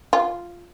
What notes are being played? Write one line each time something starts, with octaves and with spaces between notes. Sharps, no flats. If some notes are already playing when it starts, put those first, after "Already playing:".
F4